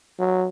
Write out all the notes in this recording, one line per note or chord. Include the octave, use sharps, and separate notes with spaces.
F#3